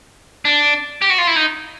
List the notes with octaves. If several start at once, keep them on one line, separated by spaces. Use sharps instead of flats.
D4
G4
F#4
F4
E4
D#4